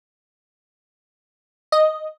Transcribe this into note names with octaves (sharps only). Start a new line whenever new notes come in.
D#5